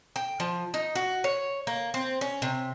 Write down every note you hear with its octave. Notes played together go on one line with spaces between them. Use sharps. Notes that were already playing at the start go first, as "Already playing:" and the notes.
G5
F3
D#4
F#4
C#5
A#3
C4
C#4
C3